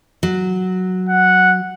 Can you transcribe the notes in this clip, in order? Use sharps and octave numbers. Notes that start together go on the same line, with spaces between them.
F#3
F#5